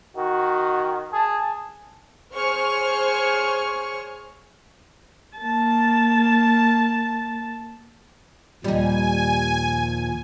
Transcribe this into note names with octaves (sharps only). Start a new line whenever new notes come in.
D#3 F#4
G#4 A5
G#4 C5 C#5 C#6 F6
A#3 A5
D#2 A#2 F3 G3 D#4 G#5